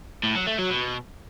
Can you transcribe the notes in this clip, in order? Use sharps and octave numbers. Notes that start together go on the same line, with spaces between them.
A2
F#3
A3
F#3
B2